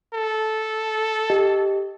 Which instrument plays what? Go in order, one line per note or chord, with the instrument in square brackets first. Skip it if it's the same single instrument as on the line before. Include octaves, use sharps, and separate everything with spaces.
[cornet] A4
[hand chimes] G4 D#5